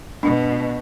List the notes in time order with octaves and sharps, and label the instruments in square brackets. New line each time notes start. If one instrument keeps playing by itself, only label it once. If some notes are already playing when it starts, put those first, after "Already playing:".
[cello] B2 [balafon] D4